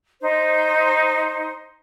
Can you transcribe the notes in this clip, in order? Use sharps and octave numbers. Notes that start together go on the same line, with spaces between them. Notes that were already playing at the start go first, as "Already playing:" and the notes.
D#4 C5